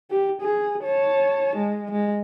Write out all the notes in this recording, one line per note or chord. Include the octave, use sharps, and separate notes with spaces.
G4
G#4
C#5 A5
G#3
G#3